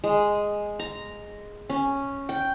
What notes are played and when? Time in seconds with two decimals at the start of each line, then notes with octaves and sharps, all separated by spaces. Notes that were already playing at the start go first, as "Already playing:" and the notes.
0.04 G#3
0.79 A#5
1.70 C#4
2.29 G5